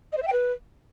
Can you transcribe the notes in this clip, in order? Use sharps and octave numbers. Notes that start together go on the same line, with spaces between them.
D#5
C5
E5
G5
B4